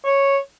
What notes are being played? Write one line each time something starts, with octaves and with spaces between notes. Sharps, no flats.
C#5